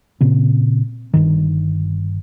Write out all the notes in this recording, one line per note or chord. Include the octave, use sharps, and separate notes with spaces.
A#2 C#3 C4
G1 G2 D#3